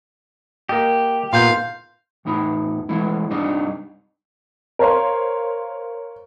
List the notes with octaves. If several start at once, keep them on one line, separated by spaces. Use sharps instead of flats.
A#3 G4 D#5
A#2 B3 F5 C6 G6
E2 A2 D#4 B5
E3 G#3 A3 E4
C2 G2 G3 D4 D#4 D#5
A#4 C5 C#5 F5 C6